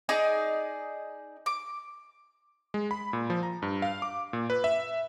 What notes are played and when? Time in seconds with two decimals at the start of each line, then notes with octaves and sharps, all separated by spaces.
0.09 D#4 G#4 D5 G#5
1.46 D6
2.74 G#3
2.91 B5
3.13 A#2
3.30 F3
3.43 A#5
3.62 G2
3.82 F5
4.02 D6
4.33 A#2
4.50 B4
4.64 E5